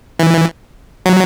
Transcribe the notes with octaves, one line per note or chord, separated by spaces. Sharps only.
E3
F#3